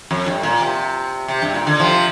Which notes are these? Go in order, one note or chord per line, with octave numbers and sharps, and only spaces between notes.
F2
G2
A#2
C3
C3
G2
A#2
D3
C3 F3